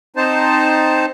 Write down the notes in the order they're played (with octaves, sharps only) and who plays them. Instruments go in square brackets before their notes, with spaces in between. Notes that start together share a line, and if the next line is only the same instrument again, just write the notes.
[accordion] C4 D#4 C5 A5